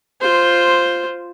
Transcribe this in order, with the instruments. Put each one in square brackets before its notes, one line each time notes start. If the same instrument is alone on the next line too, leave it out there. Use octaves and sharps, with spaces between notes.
[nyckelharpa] F4 C5